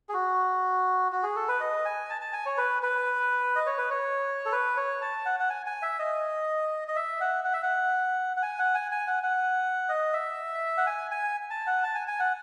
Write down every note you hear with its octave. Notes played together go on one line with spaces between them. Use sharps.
G#4
F#4
F#4
G#4
A4
B4
D#5
G#5
A5
A5
G#5
C#5
B4
B4
D#5
C#5
B4
C#5
A4
B4
C#5
A5
F#5
F#5
G#5
G#5
E5
D#5
D#5
E5
F#5
F#5
E5
F#5
F#5
G#5
F#5
G#5
G#5
F#5
F#5
D#5
E5
F#5
G#5
G#5
A5
F#5
A5
G#5
G#5
F#5